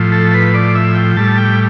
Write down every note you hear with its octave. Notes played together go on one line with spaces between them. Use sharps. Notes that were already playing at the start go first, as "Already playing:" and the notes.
Already playing: A2 F3
A4
B4
D5
E5
G5
A2 G3 A5
G5